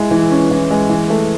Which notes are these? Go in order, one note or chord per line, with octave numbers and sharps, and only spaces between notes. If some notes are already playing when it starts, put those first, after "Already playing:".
Already playing: G#3 E4
E3
C#4
E3
G#3
E3
A3